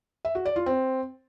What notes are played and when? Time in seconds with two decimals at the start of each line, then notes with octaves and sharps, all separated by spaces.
0.25 E5
0.35 F#4
0.45 D5
0.56 F4
0.66 C4